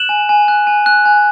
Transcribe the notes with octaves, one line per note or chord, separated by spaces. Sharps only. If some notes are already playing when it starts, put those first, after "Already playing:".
Already playing: F#6 E7 F#7
G#5
G#5
F#6
G#5
F#6
G#5